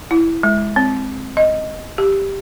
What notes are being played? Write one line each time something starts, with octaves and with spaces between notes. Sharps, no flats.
E4
G#3
C4
D#5
G4